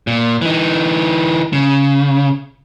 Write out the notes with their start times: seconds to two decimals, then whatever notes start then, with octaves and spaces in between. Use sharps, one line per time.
0.07 A#2
0.41 E3 D#4
1.53 C#3